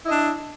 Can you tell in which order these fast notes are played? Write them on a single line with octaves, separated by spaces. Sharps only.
E4 D#5 D4